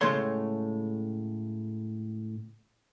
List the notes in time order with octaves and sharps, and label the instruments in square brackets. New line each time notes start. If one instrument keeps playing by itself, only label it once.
[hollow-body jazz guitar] A2 C#3 G#3 A3 C#5 C6